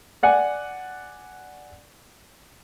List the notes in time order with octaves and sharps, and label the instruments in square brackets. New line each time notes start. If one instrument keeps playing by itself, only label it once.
[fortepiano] D5 F#5 G#5